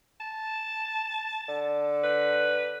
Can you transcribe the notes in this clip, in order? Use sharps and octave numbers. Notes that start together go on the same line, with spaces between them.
A5
D3
B4